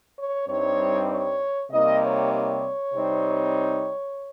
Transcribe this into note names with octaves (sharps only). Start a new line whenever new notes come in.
C#5
G2 G3 C4 D#4 C#5
C#5
C3 G3 A#3 D#4 D#5
C#5
C#5
C3 G3 C4 D#4